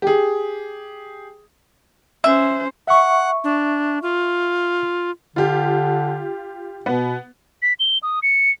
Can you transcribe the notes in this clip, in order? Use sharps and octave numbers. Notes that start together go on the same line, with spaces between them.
G4 G#4
C#4 C5 E5
E5 F#5 C#6
D4
F4
D3 F4 G4
B2 B3
B6
G7
D#6
C#7